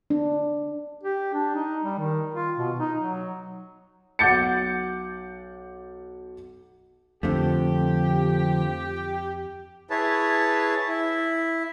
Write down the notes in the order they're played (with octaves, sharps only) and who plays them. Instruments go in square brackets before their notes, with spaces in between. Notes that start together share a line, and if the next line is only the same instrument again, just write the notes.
[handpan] D4
[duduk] G4
D4
D#4
G3
D#3
F4
B2
D#4
F#3
[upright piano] B1 F#5 D6 G6 A6 C#7
[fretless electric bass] F2 [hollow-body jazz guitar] D3 A3 [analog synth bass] F3 [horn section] G4
[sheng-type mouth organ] E4 G#4 B4 C#5 A5
E4